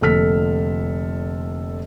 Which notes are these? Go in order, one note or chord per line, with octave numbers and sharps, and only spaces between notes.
F1 A#2 D3 A4 F6 B6